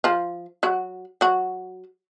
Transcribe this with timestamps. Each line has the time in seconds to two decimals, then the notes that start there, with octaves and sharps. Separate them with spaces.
0.04 F3 F4
0.63 F#3 F#4
1.21 F#3 F#4